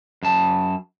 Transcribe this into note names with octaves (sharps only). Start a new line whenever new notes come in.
F#2 A5